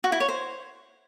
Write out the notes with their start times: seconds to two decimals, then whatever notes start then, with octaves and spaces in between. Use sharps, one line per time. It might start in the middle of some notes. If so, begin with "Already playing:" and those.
0.04 F#4
0.12 E4
0.20 C#5
0.28 C5